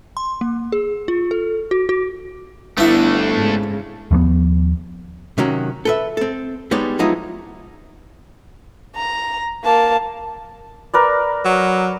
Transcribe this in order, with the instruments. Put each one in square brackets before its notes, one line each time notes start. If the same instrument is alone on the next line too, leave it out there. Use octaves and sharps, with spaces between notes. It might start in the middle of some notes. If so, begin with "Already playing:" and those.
[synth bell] C6
A#3
G#4
F4
A4
F#4
F#4
[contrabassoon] G1 [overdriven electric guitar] A3 D4 [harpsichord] B3 E4
[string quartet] G#2 C#3
[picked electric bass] D#2 F3 G3 B3
[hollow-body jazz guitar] C3 D#3 F#3 C#4 F#4
A4 B4 E5
C4 A4
G3 G#3 B3 D#4 C#5 D5
F3 F#3 G#3 B3 D#4 E4
[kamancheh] A#5
A#3 A5
[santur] A#4 B4 D5
[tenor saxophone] F#3